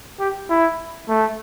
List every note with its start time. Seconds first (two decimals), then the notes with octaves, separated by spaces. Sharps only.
0.20 G4
0.49 E4
1.08 A3